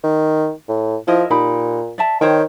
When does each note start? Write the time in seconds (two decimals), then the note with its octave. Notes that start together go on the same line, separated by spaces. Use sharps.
0.04 D#3
0.69 A2
1.07 F3 E4 A#4 D#5
1.30 A#2 D#4 G4 B5
1.98 D5 E5 A5
2.21 D#3 C5 C#5 G5